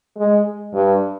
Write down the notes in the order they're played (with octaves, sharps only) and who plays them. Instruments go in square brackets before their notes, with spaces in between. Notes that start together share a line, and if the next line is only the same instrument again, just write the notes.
[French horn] G#3
G2